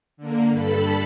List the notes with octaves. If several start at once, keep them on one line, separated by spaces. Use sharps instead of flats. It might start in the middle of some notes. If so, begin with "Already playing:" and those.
D3 A#3
G2 A4 B5